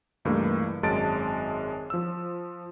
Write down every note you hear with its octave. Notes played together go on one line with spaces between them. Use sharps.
C#2 G2 E3 A3 A#3
G#1 F#2 G#3 A5 A6 D7
F3 E6